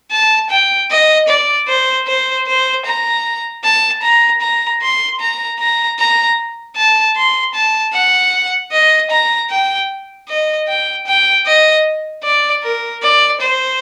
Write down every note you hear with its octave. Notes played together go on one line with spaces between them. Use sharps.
A5
G5
D#5
D5
C5
C5
C5
A#5
A5
A#5
A#5
C6
A#5
A#5
A#5
A5
C6
A5
F#5
D#5
A#5
G5
D#5
G5
G5
D#5
D5
A#4
D5
C5